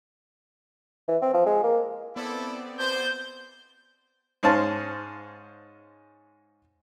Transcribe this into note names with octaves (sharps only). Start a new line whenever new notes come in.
E3
C4
F3
G#3
A#3
B3 C4 E4 A4 D5
C5 G6
G#2 G#3 C#4 C5 F5 A5